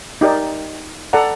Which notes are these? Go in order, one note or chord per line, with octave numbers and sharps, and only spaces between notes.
D#4 G4 A#4 D5
A4 D5 F#5 A#5